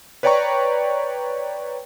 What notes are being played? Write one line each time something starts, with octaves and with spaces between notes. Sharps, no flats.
B4 C#5 D5 G5 A#5 C#6